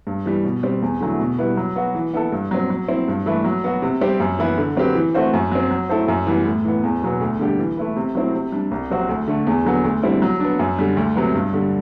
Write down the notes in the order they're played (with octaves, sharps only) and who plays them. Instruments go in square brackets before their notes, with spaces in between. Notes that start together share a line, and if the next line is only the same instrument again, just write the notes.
[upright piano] G2
E3 G3
B2
G3 C4
E2
D3 F#3 A3 E4
B2
G3 B3 E4 B4
F#3
B3 F#4
E3
B3 E4 A4
G2
F#3 C4
F#3
C4 E4
G2
E3 A3 E4 B4
F#3
B3 F#4
C3
G3 C4 G4
F#2
E3 B3 E4 B4
D3
F#3 C4 G4 B4
E3
A3 C4 F#4 C5
F#2
F#3 C4
F#3
A3 E4 A4 C5
F#2
E3 G3 B3
A2
E3 B3
E2
B2 F#3 B3
D2
D3 G3 D4 G4
E3
A3 E4 B4
C3
F#3 A3 C4 E4
C3
G3 D4
C2
C3 F#3 C4 F#4
D2
D3 A3
E2
D3 F#3 B3
D2
D3 G3 C4 E4
F#3
B3 D4
F#2
D3 G3
D2
C3 F#3 B3
G2
D3 G3